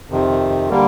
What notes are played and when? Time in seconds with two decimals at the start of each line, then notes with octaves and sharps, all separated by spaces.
0.10 F2 C3 D#3
0.70 D3 G3 A#3